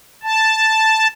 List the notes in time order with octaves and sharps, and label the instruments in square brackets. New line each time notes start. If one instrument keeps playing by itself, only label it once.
[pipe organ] A5